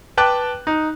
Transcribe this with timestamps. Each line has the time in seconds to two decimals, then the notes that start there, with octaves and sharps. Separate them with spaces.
0.17 B4 G5 A5 D6 F#6
0.67 D#4